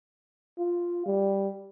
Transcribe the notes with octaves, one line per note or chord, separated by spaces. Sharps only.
F4
G3